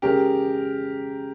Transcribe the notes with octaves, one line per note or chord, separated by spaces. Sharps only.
C#3 G#3 C#4 G4 G#4 A#4